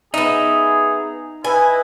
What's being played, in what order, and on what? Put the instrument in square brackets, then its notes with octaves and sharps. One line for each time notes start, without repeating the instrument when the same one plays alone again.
[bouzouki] B3 E5 [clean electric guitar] D#4 [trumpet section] G#4
[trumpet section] E4 D#5 [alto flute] B4 [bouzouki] G#5